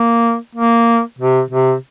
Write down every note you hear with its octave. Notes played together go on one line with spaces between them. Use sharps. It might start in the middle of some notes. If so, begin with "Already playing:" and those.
Already playing: A#3
A#3
C3
C3